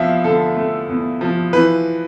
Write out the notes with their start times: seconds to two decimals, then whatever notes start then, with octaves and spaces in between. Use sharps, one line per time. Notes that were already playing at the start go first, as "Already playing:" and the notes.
Already playing: E2 F3 E5 F5
0.24 D3 A4
0.56 A3
0.89 E2
1.21 F3
1.53 E3 B4